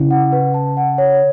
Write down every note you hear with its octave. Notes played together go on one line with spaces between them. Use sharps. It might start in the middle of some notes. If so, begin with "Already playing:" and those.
Already playing: C#3 E4
F#5
B4
A5
F#5
C#5